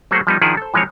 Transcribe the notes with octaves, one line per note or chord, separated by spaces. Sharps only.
F#3 A3 A#3 G#4 C5 F#5
F3 G3 B3 D#4
D#3 F3 D4 E4 G#4 F#5
A4 C5
E3 F3 G#3 C4 C#5